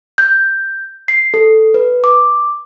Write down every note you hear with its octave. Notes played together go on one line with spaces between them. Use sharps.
G6
C7
A4
B4
D6